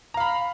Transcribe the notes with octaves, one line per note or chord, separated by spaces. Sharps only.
F5 A#5 B5